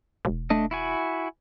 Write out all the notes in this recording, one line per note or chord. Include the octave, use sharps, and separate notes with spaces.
E1
A3 D4 D#5
E4 F#4 G#5